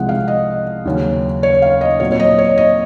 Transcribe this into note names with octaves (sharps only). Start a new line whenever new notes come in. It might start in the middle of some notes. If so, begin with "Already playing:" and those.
Already playing: C2 C3 F3 G#3 F#5
F5
D#5
D#2 C#3 F#3 C#4
C#5
F5
D#5
A#2 F#3 C4 C#5
C#5
D#5
C#5
D#5